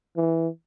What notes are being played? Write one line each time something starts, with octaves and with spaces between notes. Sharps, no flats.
E3